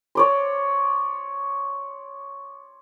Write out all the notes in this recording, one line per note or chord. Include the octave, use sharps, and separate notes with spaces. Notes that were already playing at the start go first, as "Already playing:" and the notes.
C#5 D5 C6